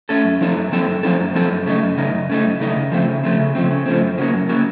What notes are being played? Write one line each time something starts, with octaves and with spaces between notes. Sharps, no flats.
A3 C#4 A4
F#2
F3 C4 D#4 A4
F#2
F3 C4 D#4 A4
F#2
F3 C4 D#4 A4
F#2
F3 C4 D#4 A4
F#2
C#3 A3 D#4
F#2
C#3 A3 D#4
F#2
C#3 A3 D#4
F#2
C#3 A3 D#4
C#3
F3 A3 C4
C#3
F3 A3 C4
C#3
F3 A3 C4
C#3
F3 A3 C4
F#2
C#3 F#3 A#3
F#2
C#3 F#3 A#3